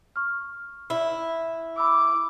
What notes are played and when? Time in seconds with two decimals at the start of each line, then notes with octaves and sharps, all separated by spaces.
0.16 C#6 F6
0.90 E4
1.78 B5 D6 E6